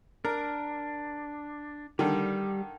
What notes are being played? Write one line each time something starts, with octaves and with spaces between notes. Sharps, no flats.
D4 A#4
D3 D#3 G3